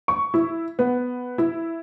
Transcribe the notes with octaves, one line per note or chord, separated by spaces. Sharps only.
C#6
E4
B3
E4